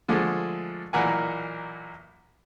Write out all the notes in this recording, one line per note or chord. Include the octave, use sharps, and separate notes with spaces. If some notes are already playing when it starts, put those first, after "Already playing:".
D3 F3 G#3 A3
B1 A#2 E3 A#3 F#5 G#5